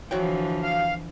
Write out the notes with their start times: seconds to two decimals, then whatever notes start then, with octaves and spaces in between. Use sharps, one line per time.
0.11 D3 E3 F3 F#4 C#5 G5
0.63 F5